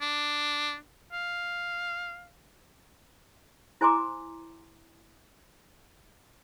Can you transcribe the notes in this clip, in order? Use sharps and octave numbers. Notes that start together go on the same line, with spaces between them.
D4
F5
E4 C5 G#5 A#5 C6 D6